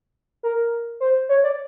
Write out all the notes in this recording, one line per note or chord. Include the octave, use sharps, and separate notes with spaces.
A#4
C5
C#5
D5